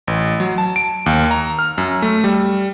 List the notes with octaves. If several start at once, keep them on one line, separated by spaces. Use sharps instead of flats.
A1
F#3
A5
D7
D#2
A#5
F6
F#2
A3
G3